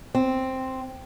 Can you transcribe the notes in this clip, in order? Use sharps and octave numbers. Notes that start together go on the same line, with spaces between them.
C4